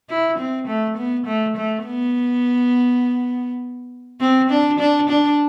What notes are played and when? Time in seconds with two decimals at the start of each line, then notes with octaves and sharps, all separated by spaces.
0.10 E4
0.38 C4
0.67 A3
0.97 B3
1.26 A3
1.57 A3
1.86 B3
4.21 C4
4.50 D4
4.79 D4
5.09 D4